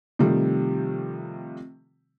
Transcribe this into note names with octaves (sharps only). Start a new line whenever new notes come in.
C3 D#3 F3 G3 A3